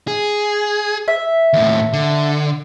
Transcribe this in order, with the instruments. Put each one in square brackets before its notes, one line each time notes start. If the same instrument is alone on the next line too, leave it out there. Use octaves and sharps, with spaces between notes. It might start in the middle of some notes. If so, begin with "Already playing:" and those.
[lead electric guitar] G#4
[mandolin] E5
[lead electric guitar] D#2 A2
D3